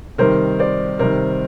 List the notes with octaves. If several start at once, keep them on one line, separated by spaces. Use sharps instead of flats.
C3 D#3 G3 A#4 C5
C5 D5
C3 D#3 G3 A#4 C5